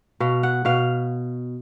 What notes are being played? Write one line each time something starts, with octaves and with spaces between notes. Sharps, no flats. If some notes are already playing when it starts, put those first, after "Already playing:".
B2 F5
F#5
B2 F5